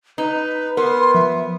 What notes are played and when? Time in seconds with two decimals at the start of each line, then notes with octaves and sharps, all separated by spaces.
0.18 D#4 B4
0.77 B3 A#4 B4 C6
1.15 F3 E5